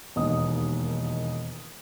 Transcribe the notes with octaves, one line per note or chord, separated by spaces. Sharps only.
E1 D#2 D#5 D#6